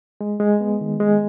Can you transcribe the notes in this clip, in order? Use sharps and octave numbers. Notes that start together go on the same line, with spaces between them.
G#3
G#3
B3
D#3
G#3